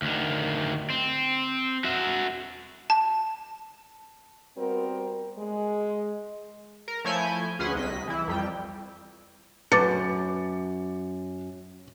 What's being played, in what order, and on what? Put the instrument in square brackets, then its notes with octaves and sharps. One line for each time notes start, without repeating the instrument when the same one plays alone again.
[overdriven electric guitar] D2 D#3
C4
F#4 E5
[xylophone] A5
[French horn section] G3 B3 C4 F#4 A#4
G#3
[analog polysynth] A#4
F3 A3 E4 C#5 G#5 G6
D2 C#4 G#4 B4 F#5 C6
C2 D#5 B6
E3 E4
F2 G3 G5
[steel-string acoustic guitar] F#2 [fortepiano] B4 [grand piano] D6 A6 C#7